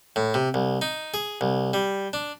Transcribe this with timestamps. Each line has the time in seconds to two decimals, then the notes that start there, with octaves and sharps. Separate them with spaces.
0.16 A2
0.34 C3
0.54 C2
0.82 D#4
1.14 G#4
1.41 C2
1.74 G3
2.13 D4